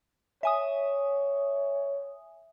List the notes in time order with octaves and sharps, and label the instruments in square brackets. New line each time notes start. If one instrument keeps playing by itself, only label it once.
[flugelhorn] C#5 [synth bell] E5 G#5 D#6